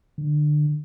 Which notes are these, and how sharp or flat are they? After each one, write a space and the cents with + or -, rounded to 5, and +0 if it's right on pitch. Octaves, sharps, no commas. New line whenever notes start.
D3 +25